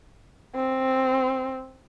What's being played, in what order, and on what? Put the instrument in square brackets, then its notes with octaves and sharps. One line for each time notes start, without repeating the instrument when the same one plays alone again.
[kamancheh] C4